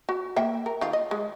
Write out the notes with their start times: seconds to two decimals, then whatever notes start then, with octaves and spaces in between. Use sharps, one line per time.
0.09 F#4
0.36 A#3 E5 G5
0.66 A#4
0.81 D#3 F4
0.93 D#5
1.11 G#3